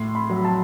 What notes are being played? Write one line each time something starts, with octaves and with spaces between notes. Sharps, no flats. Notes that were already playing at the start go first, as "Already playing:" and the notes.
Already playing: A2 C6
B5
F#3
A5